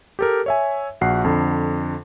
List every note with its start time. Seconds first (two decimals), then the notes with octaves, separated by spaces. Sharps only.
0.19 G4 A4 A#4
0.46 C#5 E5 G#5
1.01 A#1 F#4 F#5 C7
1.24 F2 D3